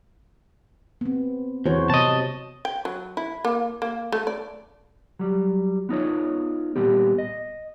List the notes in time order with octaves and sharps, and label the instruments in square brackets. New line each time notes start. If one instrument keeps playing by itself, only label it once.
[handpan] B3 C4
[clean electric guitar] E2 [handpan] F#4 C5 C#5
[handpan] C3 [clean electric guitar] D#5 A5
[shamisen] G5
F#3
E4
A#3
A#3
A3
D5
[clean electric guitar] F#3 G3
B3 D#4 F4 C#5
A#2 G3 B3 G4
D#5